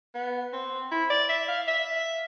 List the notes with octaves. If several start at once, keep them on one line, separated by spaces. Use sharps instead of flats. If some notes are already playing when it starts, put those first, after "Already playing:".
B3
C4
E4
D5
E5
F5
E5